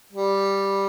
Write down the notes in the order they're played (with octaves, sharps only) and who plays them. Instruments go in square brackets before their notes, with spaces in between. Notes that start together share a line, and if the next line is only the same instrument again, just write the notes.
[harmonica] G3